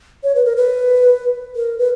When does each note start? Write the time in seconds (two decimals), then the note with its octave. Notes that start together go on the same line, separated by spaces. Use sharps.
0.24 C#5
0.35 B4
0.45 A#4
0.57 B4
1.56 A#4
1.78 B4